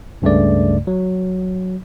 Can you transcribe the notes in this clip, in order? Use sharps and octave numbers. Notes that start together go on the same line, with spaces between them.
C#2 G2 C#3 A3 D5
F#3